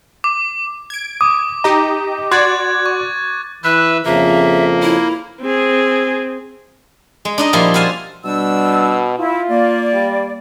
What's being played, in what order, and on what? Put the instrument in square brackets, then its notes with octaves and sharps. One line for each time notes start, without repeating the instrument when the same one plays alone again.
[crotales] D6
[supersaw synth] G#6 D7
[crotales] D6 [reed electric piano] D#6
[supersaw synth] D#4 G4 D#5 [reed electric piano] A#5
[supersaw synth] F#4 D5 [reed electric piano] C6 [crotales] F#6 G#6 A6
[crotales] C#6
[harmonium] E3 [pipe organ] B4 E5 [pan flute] F#6
[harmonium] F2 C#3 F3 [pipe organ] A#3 [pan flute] E5
[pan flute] E4
[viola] C4 G#4
[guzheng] G#3
D4 D#4 D#5
A#2 F3 G3 E4 C6
F#4 C5 F5 G#5 A5
[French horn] B2 [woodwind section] G3 D4 E6
[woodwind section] E4 [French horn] F4
[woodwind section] A#3 D5
[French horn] G3